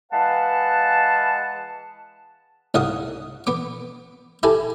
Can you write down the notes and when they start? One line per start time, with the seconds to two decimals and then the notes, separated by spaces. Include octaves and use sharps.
0.12 E3 G#3 B4 F5 F#5 A5
2.74 C2 G#2 F5 F#5 D#6
3.47 B3 D6
4.43 E4 G4 A4 G#5